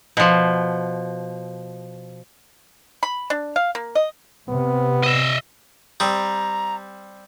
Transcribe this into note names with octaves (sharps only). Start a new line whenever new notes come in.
B2 F3
B5
D4
F5
A#3
D#5
C3 B3
D#5 E5
G3 C4 A#5 D#6